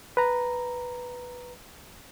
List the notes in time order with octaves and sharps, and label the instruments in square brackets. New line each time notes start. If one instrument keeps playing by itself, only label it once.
[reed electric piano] B4 A#5